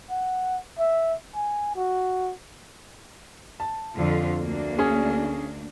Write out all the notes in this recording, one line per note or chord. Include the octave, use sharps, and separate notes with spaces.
F#5
E5
G#5
F#4
A5
F2 D3 F4
D2 A#3 D4
C#4 G#4